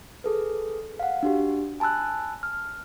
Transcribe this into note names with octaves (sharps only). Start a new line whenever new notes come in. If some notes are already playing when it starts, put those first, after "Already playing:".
G#4 A4 B4
F5 F#5
D4 F#4 G4
G#5 A5 B5 E6 F#6
F6